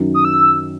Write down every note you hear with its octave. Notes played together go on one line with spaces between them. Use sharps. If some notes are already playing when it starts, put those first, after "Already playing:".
Already playing: F#2 D#3 F#3
D#6
E6